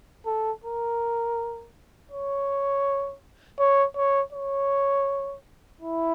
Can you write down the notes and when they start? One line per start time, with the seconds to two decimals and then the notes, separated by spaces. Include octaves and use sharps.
0.26 A4
0.64 A#4
2.11 C#5
3.59 C#5
3.96 C#5
4.33 C#5
5.81 E4